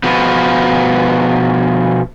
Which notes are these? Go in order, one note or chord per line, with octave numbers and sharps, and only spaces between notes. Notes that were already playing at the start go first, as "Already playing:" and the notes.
B2 F3 B3